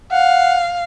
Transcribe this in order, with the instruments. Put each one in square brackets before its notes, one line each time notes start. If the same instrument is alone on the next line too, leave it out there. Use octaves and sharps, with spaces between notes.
[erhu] F5 [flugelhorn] F#5